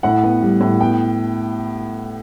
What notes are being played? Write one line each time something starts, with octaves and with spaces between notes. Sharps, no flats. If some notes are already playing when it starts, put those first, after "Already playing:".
A2 F#5
B3
G3
A2
B3 G5